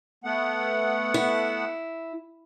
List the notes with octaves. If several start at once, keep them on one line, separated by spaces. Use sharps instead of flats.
A3 B3 F#5
E4